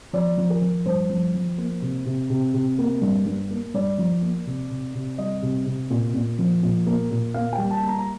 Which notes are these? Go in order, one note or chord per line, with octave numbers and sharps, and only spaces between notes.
F3 D5
F3
A#4
F3
G2 C5
F3
F3
A#3
C3
C3
C3
C3
A#3
G2
G2
A#3
G2 D5
F3
A#3
C3
C3
C3
G3 D#5
C3
C3
A#2
A#2
F3
A#2
A#3
A#2
A#3 F5
G5
G3
A5
A#3
A#5
A#5